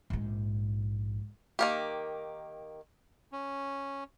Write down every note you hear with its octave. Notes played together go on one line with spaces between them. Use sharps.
A#1 G#2
D#3 A#3 G4
C#4